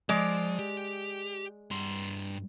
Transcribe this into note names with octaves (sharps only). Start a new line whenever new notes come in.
F3 G#3 D5
G4
G2 C6